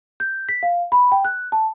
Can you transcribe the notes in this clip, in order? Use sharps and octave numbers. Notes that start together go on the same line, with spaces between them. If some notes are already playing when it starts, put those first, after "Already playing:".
G6
B6
F5
B5
G5
F#6
A5